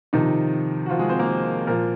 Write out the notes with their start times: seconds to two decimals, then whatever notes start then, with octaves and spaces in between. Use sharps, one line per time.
0.13 C3 D#3 F3 D#4
0.86 F#4
0.90 F3 F4
0.99 G#3 G#4
1.09 C4 C5
1.19 A#3 A#4
1.67 A#2 F3 A#3 A#4